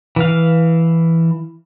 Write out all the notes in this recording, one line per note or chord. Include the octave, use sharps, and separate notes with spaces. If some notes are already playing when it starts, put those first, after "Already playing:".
E3 F5